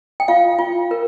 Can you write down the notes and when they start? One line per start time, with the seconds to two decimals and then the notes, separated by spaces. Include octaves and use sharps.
0.20 G5
0.28 F4 F5
0.59 F4
0.91 A#4